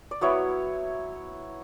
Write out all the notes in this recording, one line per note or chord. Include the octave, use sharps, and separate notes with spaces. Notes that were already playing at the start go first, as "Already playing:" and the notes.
D5
F#3 B3 E4 C#5